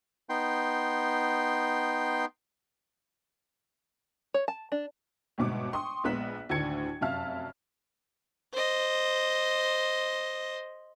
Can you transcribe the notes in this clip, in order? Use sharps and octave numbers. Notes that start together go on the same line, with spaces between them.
B3 D#4 G5 C6
C#5
A5
D4
G1 G#2 B2 D6
G5 C6 C#6 D#6
A#1 G#3 B3 F#6 B6 E7
D2 A2 D3 D#3 G#6 C#7
F1 F#2 E5 F5 A5 F6
C5 D#5